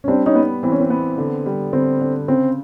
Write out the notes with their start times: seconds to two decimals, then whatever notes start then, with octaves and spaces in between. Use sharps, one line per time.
0.04 C#4
0.08 G3 C4 D4
0.26 C#4 D#4
0.35 B3
0.63 E3 C4
0.72 C#4
0.80 C4
0.90 B3
1.18 D3
1.46 G3
1.73 D3 C4
2.01 D3
2.28 C#3 C4